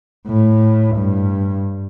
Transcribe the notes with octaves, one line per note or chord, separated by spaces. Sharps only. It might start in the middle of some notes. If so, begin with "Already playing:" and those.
A2
G2